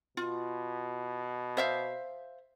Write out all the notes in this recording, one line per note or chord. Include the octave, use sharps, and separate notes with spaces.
B2 F4
C5 E5 F5